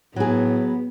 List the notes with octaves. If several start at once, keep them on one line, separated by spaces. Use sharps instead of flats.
A2 F#3 B3 G#4